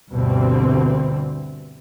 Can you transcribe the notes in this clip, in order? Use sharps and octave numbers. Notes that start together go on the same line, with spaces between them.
D2 G2 B2 D3 E3 C4